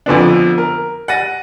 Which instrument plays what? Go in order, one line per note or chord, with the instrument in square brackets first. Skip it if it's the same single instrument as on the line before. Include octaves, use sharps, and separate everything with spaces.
[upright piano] F2 D3 B3 D4
A#4
F#5 A6 A#6 D#7